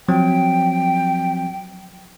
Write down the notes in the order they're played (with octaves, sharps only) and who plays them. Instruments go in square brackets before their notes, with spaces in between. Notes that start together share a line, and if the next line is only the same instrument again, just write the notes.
[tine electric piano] F3 F#3 C4 [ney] G5